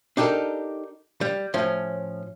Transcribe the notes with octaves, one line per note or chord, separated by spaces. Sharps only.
D4 D#4 G4 A4 A#4
G3
A2 F3 C#4